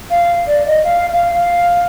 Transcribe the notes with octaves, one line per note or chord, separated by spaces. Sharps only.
F5
D5
D#5
F5
F5
F5